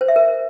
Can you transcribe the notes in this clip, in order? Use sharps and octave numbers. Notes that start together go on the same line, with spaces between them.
C5
E5
A#4